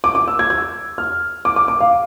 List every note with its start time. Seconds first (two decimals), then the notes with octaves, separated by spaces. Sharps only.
0.04 D6
0.15 D6
0.28 E6
0.39 G#6
0.50 G#6
0.98 F6
1.45 D6
1.56 D6
1.68 D6
1.80 F5